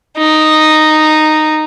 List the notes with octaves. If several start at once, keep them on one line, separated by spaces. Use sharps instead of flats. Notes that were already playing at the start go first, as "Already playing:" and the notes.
D#4